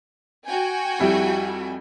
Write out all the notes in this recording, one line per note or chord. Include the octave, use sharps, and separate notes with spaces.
F#4 G5 G#5
F2 G3 E4